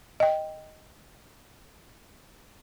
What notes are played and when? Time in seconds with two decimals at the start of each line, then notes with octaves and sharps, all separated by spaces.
0.20 D#5 G5